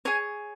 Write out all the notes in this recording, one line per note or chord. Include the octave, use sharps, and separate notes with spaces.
G#4 C#5 G#5